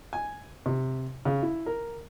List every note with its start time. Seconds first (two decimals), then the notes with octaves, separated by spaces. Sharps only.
0.13 G#5
0.66 C3
1.25 C#3
1.42 E4
1.66 A#4